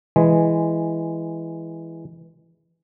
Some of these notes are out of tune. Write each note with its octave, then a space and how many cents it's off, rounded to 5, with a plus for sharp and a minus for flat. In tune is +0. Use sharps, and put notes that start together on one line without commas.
E3 +0 G#3 +0